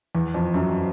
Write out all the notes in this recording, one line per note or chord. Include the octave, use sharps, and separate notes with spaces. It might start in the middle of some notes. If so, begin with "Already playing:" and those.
E2
F2
F#2